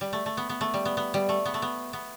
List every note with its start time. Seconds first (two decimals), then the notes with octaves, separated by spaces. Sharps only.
0.01 G3
0.13 A3
0.26 A3
0.37 B3
0.49 B3
0.61 A3
0.74 G3
0.85 B3
0.97 B3
1.14 G3
1.29 A3
1.46 B3
1.54 A3
1.62 B3
1.93 B3